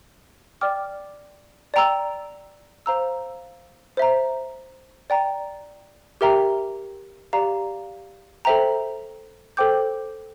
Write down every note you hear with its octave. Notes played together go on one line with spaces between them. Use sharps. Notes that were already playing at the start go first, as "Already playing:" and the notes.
D5 G5 D6 F6
D5 G5 A#5 E6
C5 F5 A#5 E6
C5 E5 A#5
D5 G5 A#5
G4 A#4 E5 G5 A#5
G4 D5 F5 A#5
A4 C5 E5 G5 A#5
A4 C5 G5 D6 G6